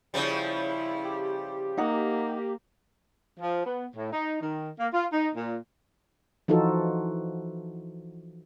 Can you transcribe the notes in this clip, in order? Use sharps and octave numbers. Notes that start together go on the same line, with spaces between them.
C#3 F3 G3 E4
G4
A#3 D#4 F#5
F3
B3
A2
D#4
D#3
A#3
F4
D#4
A#2
E3 F3 D#4 F4 F#4 A4